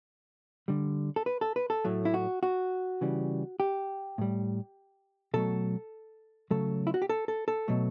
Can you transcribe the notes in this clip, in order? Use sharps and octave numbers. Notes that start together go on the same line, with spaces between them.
D3 G3
A4
B4
A4
B4
A4
A2 F#3 A3
E4
F#4
F#4
C#3 E3 G3
G4
A2 G3
B2 F#3 A3 A4
C#3 F#3 A3 A4
E4
F#4
G4
A4
A4
A4
B2 F#3 A3